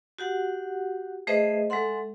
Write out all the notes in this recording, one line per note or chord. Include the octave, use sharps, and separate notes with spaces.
F#4 G4 F#5
A3 G#4 B4 C5 D#5 E5
G#3 A4 E5 F#5 C6